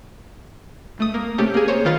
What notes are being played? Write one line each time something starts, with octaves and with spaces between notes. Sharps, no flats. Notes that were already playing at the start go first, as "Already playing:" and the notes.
C#2 A3 D#6
A#3
C3 A3 C#4 G4
A#3 G#4
C5 C#5
C2 D#3 F4 B4 A6